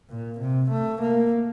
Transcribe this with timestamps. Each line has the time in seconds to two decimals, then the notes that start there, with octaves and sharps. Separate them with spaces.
0.09 A#2
0.40 C3
0.71 A3
1.02 A#3